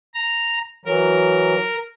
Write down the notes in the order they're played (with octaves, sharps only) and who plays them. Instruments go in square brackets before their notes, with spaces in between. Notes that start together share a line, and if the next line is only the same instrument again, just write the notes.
[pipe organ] A#5
[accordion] E3 F#3 [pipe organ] A#4